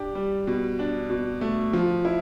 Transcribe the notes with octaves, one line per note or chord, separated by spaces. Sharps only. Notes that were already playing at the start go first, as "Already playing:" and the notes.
Already playing: D4 G4
G3
B2
D4
B2
A3
F3
E4